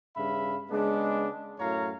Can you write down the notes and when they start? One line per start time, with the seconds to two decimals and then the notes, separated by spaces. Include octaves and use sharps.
0.16 G2 C#3 E5 F5 B5
0.71 C#3 G#3 B3 D4
1.59 F#2 A2 C#5 F5 A#5